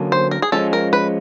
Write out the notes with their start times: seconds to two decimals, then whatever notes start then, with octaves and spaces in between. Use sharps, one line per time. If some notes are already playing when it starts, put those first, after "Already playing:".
Already playing: D3 F#3 A#3 C#4
0.12 C5
0.31 A#4
0.42 G#4
0.52 F3 G#3 C#4 F4 A4
0.73 A#4
0.93 B4